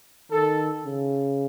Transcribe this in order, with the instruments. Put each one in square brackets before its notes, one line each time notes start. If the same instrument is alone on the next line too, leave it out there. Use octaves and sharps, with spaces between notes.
[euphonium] D#3 [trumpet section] A4
[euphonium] C#3